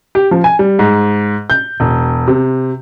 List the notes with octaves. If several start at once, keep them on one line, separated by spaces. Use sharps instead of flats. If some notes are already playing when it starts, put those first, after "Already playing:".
G4
F3
G#5
G3
G#2
G6
E1
C3